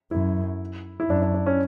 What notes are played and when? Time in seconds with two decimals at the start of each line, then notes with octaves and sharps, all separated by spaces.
0.11 F#2 E4
1.00 E4
1.09 F#2 D4
1.22 D4
1.34 D4
1.46 C#4